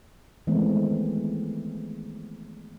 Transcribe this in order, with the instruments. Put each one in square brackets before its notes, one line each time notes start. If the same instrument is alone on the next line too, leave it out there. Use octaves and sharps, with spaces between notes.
[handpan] D#3 E3 G#3 A3 B3 C4